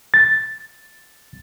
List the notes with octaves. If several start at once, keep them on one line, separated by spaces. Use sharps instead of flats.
A6